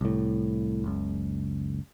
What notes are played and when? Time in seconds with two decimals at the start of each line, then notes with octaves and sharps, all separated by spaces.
0.01 C2 A2
0.84 F#1 C#2